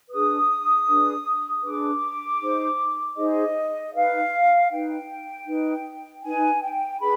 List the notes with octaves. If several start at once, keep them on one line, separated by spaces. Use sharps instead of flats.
D4 G#4 B4 D#6
D4 G#4 B4
D4 G#4 B4 D6
D#4 G#4 C5
D#4 G#4 C5 D#5
D#4 B4 F5
D#4 B4 G5
D#4 B4
D#4 B4 G#5
G5
D4 G#4 B4 B5